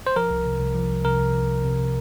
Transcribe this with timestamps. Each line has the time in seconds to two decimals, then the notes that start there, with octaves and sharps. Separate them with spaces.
0.07 C5
0.16 F3 A#4
0.31 C2
0.46 C3
0.60 C2
0.75 F3
0.90 C2
1.05 C3 A#4
1.19 C2
1.34 F3
1.49 C2
1.64 C3